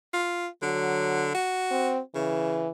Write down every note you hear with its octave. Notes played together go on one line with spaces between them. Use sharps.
F4
D3 F#3
F#4
C4
C#3 E3